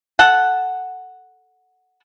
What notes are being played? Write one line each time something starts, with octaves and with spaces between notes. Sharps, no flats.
A4 F#5